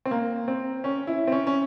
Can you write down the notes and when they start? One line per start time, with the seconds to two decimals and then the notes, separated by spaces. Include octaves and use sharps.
0.05 C4
0.11 A#3
0.48 C4
0.84 C#4
1.07 E4
1.27 C4
1.32 C#4
1.47 C#4